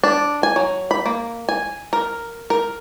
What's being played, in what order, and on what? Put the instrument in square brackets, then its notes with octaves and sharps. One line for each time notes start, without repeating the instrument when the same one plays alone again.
[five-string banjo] D4
G#5
F#3
B5
A#3
G#5
A#4
A#4